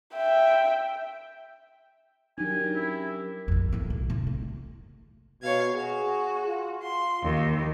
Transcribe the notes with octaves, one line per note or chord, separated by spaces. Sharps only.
E5 G5
F#3 D4 D#4 G4 A#4 G#5
C#4 E4
A#1 F2
E2 A2
B1
F1 C4
D2
B2 C#5 F5 G#6
F#4 G#4
F4
C6
D#2